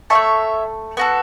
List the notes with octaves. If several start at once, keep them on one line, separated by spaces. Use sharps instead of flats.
A3 E4 A4 C#5 E5
B3 F#4 A4